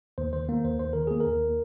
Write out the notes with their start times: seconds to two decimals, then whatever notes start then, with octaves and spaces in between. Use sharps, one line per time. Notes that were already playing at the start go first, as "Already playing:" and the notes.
0.18 D#2 C5
0.33 D#3 C5
0.49 A#3
0.64 D#2 C5
0.79 D#2 C5
0.93 D#3 A#4
1.07 A#3 G#4
1.20 A#4
1.27 D#2